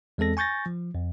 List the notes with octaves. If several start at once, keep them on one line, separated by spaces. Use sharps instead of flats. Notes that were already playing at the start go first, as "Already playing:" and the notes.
E2 G#3 C4 A4 A#6
G#5 C#6 G6 A6 A#6
F3
F2